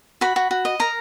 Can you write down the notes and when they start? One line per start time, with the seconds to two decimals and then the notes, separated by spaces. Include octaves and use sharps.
0.21 F#4 B5
0.36 F#4
0.51 F#4
0.65 D#5
0.80 A#4 A#5